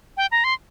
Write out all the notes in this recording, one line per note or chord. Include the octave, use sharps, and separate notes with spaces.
G5
A#5
C6